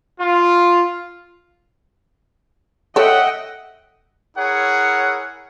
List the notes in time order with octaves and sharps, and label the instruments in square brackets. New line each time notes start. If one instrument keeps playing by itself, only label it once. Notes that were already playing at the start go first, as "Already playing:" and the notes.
[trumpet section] F4
[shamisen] A4 C#5 [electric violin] D#5 G5 [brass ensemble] E5 F#5
[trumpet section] E4 G#4 A#4 C#5 F#5